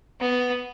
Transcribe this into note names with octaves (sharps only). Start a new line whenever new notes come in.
B3